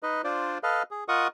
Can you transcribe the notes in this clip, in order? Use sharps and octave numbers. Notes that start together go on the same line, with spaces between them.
D#4 B4 D#5
D4 F4 C5 D5
A4 B4 D#5 F5
G#4
F4 A#4 D#5 F#5 C#6 D#6